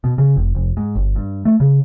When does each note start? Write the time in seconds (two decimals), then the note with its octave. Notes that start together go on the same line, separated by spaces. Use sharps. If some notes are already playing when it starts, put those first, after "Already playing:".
0.04 B2
0.18 C#3
0.36 F1
0.55 F1
0.77 G#2
0.95 G1
1.16 G2
1.45 A3
1.60 C#3